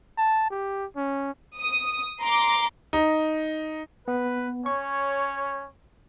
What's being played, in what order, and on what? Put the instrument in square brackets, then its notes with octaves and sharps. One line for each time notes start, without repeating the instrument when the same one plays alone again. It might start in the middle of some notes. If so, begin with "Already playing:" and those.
[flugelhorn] A5
G4
C#4
[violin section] D#6
A#5 C6 D6
[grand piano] D#4
[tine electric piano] B3 [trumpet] B4
[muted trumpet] C#4 [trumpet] C#5 [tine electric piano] C#6